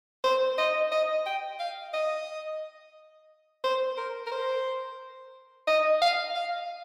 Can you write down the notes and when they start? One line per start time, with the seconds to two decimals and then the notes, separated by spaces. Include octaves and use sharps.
0.24 C5
0.58 D#5
0.92 D#5
1.26 G5
1.60 F5
1.94 D#5
3.64 C5
3.97 A#4
4.26 A#4
4.31 C5
5.67 D#5
6.02 F5
6.35 F5